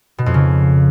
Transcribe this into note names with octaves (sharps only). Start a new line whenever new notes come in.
B2
F2
C#3